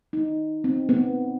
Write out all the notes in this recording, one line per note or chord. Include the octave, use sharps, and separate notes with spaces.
D#4
C4
B3